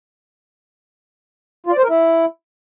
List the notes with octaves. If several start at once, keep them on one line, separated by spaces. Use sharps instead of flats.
F4
D5
C5
A#4
E4